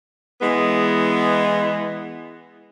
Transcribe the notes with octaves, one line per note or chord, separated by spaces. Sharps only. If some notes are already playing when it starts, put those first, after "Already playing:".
E3 G#3 B3